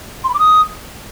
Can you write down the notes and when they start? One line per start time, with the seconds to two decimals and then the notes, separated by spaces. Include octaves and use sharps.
0.24 C6
0.29 B5
0.34 D6
0.39 D#6